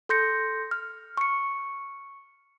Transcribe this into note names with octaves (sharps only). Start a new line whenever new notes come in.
A4 C6 G6 A#6 C#7
F6
C#6 C#7